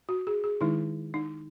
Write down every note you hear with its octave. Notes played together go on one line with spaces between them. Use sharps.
F#4
G#4
G#4
D#3 G#3 D#4 E4
D#4